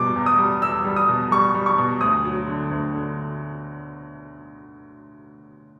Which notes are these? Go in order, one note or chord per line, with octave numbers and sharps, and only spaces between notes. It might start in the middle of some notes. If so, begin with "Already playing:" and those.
Already playing: E2 B2 G3 D6
E2
D#6
G3
E2 E6
G3
D#6
B2
G3 C#6
G3
C#6
B2
D2 D#6
F#3
D3
D2
D3